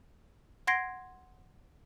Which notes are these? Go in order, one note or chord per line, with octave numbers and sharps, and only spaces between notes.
F#5 C6 G#6 A#6 C7 D7